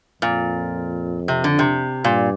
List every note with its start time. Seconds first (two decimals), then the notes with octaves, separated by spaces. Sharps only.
0.22 F2 A#2
1.28 C3
1.44 D3
1.59 C3
2.04 G2 A#2